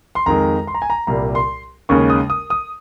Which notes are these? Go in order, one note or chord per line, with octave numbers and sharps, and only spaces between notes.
C6
F2 D#3 G#3 A#5
C6
A#5
G#5
A#5
C2 A#2 G3 A#5
C6
D#2 C#3 G#3 C#6
D#6
D#6
D#6